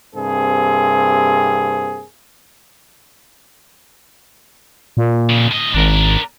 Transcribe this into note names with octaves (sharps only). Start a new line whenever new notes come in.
G2 C3 A#3 C4 G#4
A#2
F2 C#3
A2 D#5
G#1 D4 A#4